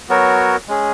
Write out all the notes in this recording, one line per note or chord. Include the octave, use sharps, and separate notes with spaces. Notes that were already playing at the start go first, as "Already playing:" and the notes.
F#3 B3 F#4 A#4 C#5
G#3 C#4 G#4